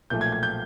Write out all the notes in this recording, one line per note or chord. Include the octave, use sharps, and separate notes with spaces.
B1 A#2 F3 A3 G6
G#6
G#6
G6